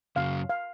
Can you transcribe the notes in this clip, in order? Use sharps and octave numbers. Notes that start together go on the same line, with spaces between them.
F#2 C#3 F#3 F5
F5